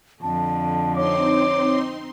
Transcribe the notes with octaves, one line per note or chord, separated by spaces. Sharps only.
F2 D3 A5
C4 D#4 C#5 C6 D6